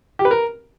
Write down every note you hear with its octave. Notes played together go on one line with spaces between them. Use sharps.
G4
B4
A#4